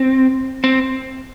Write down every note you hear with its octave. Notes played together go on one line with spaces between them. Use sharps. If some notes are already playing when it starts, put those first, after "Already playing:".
Already playing: C4
C4